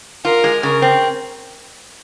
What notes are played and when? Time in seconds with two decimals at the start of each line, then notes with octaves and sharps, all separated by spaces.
0.25 F4 A#4
0.44 G#3
0.62 C#3 A#4
0.82 C4